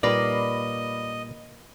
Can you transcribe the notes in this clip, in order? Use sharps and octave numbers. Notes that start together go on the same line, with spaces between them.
A#2 G3 A#3 D#4 B4 D5 D#5